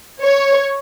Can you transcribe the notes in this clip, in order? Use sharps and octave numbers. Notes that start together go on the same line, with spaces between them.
C#5